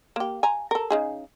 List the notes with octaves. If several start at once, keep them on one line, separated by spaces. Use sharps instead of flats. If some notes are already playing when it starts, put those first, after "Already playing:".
A#3 G4
G#5 A#5
A4 A#4
C#3 D#4 G#4